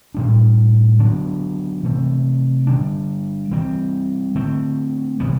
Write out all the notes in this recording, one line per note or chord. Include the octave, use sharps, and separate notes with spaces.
A2 G3 D4
D3 F#3 B3 D4
C3 E3 A3 C4
D3 G3 D4
E3 G3 C4
D3 A3 C4
C3 E3 G3 B3